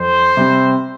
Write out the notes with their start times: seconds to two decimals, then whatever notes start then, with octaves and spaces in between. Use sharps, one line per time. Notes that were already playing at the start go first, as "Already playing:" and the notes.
Already playing: F2 C5
0.37 C3 G3 C4